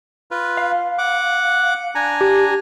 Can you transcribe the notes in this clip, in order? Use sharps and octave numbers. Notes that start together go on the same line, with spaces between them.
F4 B4
F5
F#5 D6
D4 G#5 A#5
G4